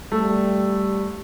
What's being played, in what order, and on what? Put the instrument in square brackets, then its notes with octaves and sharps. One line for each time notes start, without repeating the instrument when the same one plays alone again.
[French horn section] G3 [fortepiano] A3